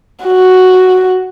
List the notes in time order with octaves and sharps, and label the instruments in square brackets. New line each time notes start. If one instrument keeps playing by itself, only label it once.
[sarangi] F#4